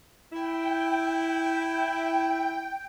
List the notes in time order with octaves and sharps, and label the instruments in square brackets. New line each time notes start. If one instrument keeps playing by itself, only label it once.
[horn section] E4 [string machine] G5